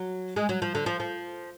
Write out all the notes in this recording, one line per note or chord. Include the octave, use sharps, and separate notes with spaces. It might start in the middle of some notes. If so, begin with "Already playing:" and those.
Already playing: F#3
G#3
F#3
F3
D3
F3
F3